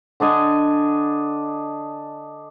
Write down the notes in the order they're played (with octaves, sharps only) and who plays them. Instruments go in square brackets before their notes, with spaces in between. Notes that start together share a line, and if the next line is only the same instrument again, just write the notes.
[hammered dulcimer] D3 D4 D#5 G#5